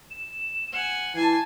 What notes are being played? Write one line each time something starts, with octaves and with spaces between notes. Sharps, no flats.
E7
F#5 G#5
E3 G#5 A5 C7